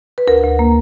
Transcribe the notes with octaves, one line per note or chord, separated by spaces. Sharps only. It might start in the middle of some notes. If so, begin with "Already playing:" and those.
B4
D2 A#4
D2
A#3